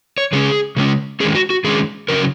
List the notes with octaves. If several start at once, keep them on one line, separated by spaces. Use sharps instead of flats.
C#5
C#3 G#3 C#4 G#4
C#3 G#3 C#4
D#3 G#3 C#4 G#4
F#4
F#4
D#3 G#3 C#4 G#4
C#3 F#3 C#4 A#4